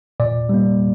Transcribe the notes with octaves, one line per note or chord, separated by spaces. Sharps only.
A#2 D5
G3 A#3